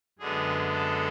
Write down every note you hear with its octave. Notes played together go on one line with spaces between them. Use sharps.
F#2 D3 G#3 B3 G#4
A4